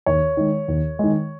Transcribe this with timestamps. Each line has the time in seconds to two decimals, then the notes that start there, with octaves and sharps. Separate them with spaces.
0.06 D#2 C#5
0.37 D#3 G#3
0.68 D#2
0.99 D#3 G#3